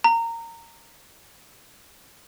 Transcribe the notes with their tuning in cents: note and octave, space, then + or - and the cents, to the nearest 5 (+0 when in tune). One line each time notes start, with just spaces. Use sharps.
A#5 -20